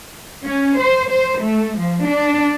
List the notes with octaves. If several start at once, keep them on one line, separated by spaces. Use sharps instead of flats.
C#4
C5
C5
A3
F3
D4